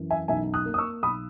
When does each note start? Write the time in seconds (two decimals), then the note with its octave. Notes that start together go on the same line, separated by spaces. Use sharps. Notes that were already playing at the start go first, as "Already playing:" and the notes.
Already playing: F#2 E3
0.10 E5 G#5
0.28 B1 E5 G#5
0.54 D#6 F#6
0.66 A#3
0.74 D#6
0.78 C#6 E6
1.03 B1 B5 D#6